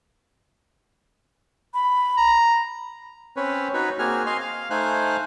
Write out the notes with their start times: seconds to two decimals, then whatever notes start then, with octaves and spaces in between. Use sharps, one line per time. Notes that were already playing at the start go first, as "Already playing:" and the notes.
1.74 B5
2.17 A#5
3.37 C4 C#4 B4 C#5
3.74 D#4 F#4 B4 C#5
3.99 A#3 C4 F#4 G#4 G#5 F6
4.26 D#5 F5 G#5 C6
4.40 F5
4.70 A3 D#4 C5 F5 G#5 F#6